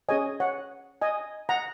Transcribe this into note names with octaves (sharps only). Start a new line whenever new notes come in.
C#4 G#4 C#5 D#5 G#5
C#5 F#5
D#5 G#5
F#5 A#5